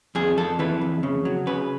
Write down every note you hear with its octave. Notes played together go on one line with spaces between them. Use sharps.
F2 G#4
F2 A4
E3 B4
F2
C#3
F#3
C#3 B4